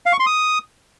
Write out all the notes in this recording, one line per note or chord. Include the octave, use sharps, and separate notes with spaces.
F5
C#6
C6
D#6